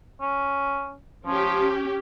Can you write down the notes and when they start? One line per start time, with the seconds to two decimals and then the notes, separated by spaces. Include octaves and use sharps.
0.21 C#4
1.26 F3 C#4 G4